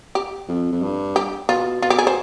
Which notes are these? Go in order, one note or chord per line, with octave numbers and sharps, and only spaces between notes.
G4
F2
F2
G2
G4
B2 F4
B2 F4
G4
G#4
C5